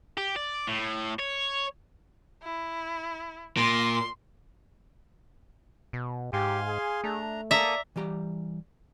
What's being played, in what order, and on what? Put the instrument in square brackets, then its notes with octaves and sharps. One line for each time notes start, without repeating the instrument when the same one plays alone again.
[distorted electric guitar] G4
D5
A2
C#5
[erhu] E4
[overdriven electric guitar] A#2 [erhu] C6
[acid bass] B2
[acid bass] G#2 [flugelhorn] G4 [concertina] F5 G#5 C6
[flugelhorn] G#4
[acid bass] A3 [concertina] D4 A#5
[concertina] A#3 A4 D#6 [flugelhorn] D5 [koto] E5 A#5
[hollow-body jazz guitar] E3 G3 G4 A#5